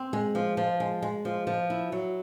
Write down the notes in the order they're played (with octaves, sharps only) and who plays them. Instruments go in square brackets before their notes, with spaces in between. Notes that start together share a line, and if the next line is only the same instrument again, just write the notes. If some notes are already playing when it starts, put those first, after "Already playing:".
Already playing: [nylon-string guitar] C4
G#3
F3
F3
G#3
G#3
F3
F3
E4
F#3